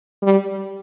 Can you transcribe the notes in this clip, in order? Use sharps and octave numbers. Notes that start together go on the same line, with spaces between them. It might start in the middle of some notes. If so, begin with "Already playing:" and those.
G3